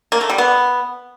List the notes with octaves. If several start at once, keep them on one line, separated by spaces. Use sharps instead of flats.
A#3
A3
G3
B3